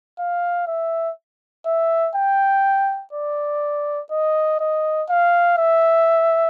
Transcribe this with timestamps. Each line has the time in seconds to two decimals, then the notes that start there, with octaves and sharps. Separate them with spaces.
0.19 F5
0.68 E5
1.66 E5
2.15 G5
3.13 D5
4.11 D#5
4.60 D#5
5.10 F5
5.58 E5